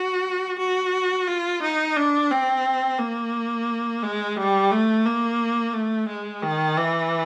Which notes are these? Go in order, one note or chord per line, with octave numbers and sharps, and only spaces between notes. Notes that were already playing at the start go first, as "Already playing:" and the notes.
Already playing: F#4
F#4
F4
D#4
D4
C4
A#3
G#3
G3
A3
A#3
A3
G#3
D#3
E3